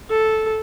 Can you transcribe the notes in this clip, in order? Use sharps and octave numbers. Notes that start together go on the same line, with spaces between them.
A4